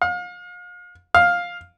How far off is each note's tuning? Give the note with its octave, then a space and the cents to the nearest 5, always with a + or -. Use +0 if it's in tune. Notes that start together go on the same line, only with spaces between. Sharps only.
F5 +40
F5 +10